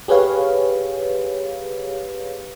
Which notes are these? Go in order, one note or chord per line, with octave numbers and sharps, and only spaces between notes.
G4 G#4 B4 C#5 F5